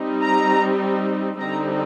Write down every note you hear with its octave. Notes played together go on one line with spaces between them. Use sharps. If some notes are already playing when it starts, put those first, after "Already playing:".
Already playing: G3 C4 D#4
A#5
D3 G3 C4 D#4 A#5